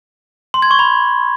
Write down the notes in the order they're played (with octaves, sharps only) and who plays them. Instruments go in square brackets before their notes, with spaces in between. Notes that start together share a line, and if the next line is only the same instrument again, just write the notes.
[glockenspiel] C6
G#6
C#6
B5